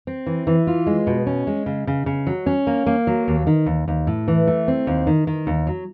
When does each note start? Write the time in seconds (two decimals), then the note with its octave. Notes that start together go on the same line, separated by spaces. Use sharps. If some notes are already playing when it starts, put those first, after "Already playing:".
0.07 C4
0.26 E3
0.47 E3
0.67 F4
0.87 G#3
1.07 B2
1.26 C#4
1.47 G#3
1.66 C#3
1.87 C#3
2.06 C#3
2.27 F#3
2.46 C#4
2.67 A#3
2.86 A#3
3.07 F#3
3.28 D#2
3.47 D#3
3.66 D#2
3.88 D#2
4.07 A2
4.28 E3
4.47 A3
4.68 C4
4.87 D#2
5.07 D#3
5.27 D#3
5.47 D#2
5.67 F#3